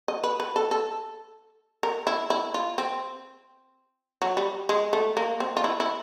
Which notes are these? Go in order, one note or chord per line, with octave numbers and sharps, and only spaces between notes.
D#5
B4
B4
A4
A4
A#4
E4
E4
F4
C4
F#3
G3
G#3
A3
A#3
C4
F4
E4
E4